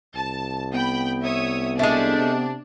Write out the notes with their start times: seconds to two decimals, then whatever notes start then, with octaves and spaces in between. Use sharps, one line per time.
0.15 C2 A5
0.73 B3 G5 B5
1.24 C#5 E5 D#6
1.79 G#3 A3 D4
2.18 C3